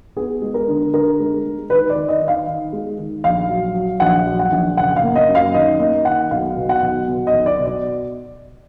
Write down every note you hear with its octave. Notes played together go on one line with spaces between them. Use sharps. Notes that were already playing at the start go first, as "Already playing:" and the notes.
B3 G#4
G#3
A#4
D3
D3 A#4
G#3
G#3
D#3 B4
D5
D#3
D#5
D#3
F5
D#3
G#3
D#3
A#1 F5
F#3
F#3
A#1 F#5
F#3
F#5
A#1
F#1 F#5
F5
A#3
D#5
F#2
F5
D#3 D#5
A#3 D#5
D#3 F#5
B1 F5
B2
F#5
B1
B2
D#5
B1
D5
B2
D5